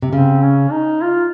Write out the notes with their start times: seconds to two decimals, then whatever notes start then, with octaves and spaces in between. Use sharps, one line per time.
0.02 C3
0.13 C#3 C4
0.42 C#4
0.72 D#4
1.02 F4